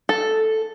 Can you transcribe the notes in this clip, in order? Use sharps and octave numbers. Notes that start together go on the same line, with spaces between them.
A4